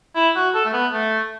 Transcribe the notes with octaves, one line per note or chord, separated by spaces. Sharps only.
E4
F#4
A4
A3
B3
A3